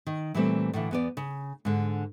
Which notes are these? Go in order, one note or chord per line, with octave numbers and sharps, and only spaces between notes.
D#3
A#2 E3 G3 A3 C4
A2 D3 E3
E2 B3 D5
C#3
G#2 D3